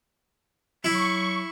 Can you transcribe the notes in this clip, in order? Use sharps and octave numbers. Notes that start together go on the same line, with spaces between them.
F#3 E4 C#6